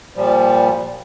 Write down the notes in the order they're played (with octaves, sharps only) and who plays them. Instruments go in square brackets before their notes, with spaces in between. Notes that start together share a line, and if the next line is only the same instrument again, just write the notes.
[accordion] A#2 F3 G3